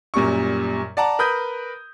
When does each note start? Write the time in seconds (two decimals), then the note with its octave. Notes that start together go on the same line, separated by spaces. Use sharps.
0.14 F#2 A#2 G3 C#6
0.97 D5 F#5 A5 A#5
1.19 A#4 B4 B5 D#6 G6